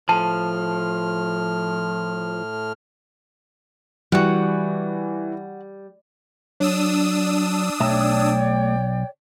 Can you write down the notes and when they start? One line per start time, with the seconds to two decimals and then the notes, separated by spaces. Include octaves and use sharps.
0.09 A2 F3 A5 F6
4.12 E3 G3 F#4 F#5
6.60 F#3 D4 D#6 E6
7.80 B1 A3 C#5 D5 G5 A5 A#5